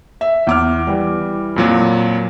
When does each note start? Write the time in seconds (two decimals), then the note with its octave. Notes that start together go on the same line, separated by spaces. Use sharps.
0.21 E5
0.47 E2 D6 F6
0.87 E3 G3
1.56 F2 A#2 F#3